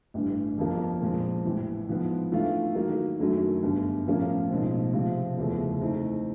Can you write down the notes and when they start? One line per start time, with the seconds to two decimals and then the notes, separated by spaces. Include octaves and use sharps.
0.14 A1 G2 D3
0.58 G1 F2 D3 F3 A#3
1.01 A#2 F3 G#3 C4
1.45 A1 A2 E3
1.88 G#2 F3 G#3 B3
2.32 G#2 E3 A3 D4 F4
2.75 D#3 F#3 A#3
3.19 F#2 D#3 F#3 A3 D4
3.63 G1 G2 D3
4.06 A2 F3 A#3 C#4 F4
4.50 B1 A2 F3 G#3 C4
4.93 C3 F3 G#3 C4 F4
5.37 F#1 E2 C3 F3 A3
5.81 E3 A3 C4 D#4